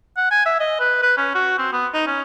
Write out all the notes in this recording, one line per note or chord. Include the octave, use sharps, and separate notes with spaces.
F#5
G#5
E5
D#5
B4
B4
C#4
F#4
C4
B3
D#4
C#4